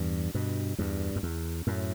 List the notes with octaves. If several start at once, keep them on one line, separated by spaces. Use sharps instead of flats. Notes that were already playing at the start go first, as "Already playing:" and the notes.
Already playing: E2 G2
G2 B2
E2 G2
F#2
E2
F#2 A2